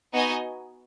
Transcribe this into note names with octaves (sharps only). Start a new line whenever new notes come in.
B3 D#4 F#4 D#5 G#5